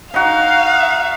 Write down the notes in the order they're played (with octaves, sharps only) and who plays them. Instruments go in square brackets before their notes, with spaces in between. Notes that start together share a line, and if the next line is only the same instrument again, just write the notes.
[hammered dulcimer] D#4 F#4 [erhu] F5